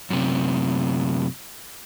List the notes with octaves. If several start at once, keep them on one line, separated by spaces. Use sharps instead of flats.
F#2 C3